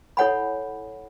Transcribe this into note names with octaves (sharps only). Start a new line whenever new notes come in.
E4 A4 C#5 F#5 G#5 B5